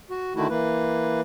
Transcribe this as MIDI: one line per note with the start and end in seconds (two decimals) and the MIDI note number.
0.10 0.33 66
0.35 0.47 50
0.35 0.47 51
0.35 0.47 57
0.35 0.47 64
0.35 0.47 66
0.49 1.21 52
0.49 1.21 58
0.49 1.21 71